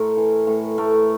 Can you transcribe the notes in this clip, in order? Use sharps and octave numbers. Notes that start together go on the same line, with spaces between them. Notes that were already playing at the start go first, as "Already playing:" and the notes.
Already playing: A2 A3 A#4 C5
E3
A2
A3 A#4